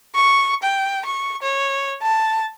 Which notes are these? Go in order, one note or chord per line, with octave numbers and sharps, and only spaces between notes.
C#6
G5
C#6
C#5
A5